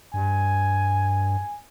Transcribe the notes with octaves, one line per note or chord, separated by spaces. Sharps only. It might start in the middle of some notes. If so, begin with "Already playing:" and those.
G2 G#5